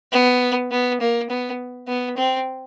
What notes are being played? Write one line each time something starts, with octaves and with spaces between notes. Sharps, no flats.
B3
B3
A#3
B3
B3
C4